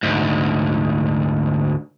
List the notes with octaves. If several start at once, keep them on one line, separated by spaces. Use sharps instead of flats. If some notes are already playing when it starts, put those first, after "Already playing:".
D2 G#2